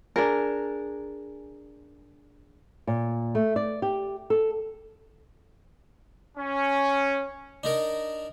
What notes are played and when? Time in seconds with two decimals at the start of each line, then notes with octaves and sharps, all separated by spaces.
0.16 D4 G#4 A#4
2.87 A#2
3.35 A3
3.56 D5
3.82 G4
4.30 A4
6.38 C#4
7.64 D4 D#4 A#4